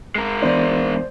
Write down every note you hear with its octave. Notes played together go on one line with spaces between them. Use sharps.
G#3 A#4
E3 B3 D4 C5 D5